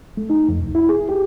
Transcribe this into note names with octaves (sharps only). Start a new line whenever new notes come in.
A3
D#4
F2
C2
E4
G#4
G4